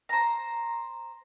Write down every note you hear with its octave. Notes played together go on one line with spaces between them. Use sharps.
C5 A#5